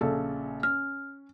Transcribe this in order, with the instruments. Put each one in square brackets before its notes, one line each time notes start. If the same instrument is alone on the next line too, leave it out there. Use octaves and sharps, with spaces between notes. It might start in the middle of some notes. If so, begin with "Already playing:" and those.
[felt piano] A#1 C#3 A4
[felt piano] C#4 [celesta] F6